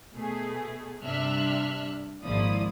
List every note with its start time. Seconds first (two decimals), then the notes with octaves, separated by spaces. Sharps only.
0.14 B2 A3 G#4
1.02 G2 C3 D4 E5 F6 F#6
2.24 G#1 A#2 F3 E4 D5 D#6